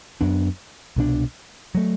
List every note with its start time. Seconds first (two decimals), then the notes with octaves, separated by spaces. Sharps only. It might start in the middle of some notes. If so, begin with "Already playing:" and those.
0.21 F#2 F#3 B3 D4
0.96 C2 B2 G3 D4
1.75 F#3 A3